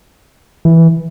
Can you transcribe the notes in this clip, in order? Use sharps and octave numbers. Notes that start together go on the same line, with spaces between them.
E3